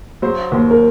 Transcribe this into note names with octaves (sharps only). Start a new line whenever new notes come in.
F#3 C5
D#2
A#4